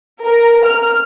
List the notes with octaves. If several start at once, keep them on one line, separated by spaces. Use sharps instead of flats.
A#4
F6